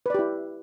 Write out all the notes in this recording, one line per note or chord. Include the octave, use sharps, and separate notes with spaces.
E4 G4 B4 D5